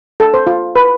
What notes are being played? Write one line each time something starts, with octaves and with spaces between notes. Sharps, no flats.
A4
C5
F4
B4